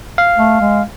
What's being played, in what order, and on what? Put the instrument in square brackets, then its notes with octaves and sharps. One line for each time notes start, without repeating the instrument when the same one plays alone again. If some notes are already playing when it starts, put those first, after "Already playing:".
[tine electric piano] F5
[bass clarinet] A3
G#3